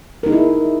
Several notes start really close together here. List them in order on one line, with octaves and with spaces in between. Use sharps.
A#4 D#4 G#4 E4